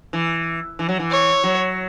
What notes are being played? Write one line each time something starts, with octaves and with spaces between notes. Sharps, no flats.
E3
E3
F#3
E3
C#5
F#3